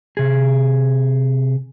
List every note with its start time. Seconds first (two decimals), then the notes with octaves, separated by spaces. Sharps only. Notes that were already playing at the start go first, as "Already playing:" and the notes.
0.17 C3 G#4